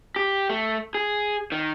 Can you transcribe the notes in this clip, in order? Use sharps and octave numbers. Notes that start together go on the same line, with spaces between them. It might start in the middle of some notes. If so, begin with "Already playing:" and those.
G4
A3
G#4
D#3